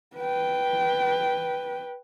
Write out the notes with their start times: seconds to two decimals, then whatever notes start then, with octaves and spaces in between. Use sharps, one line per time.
0.17 B4 G5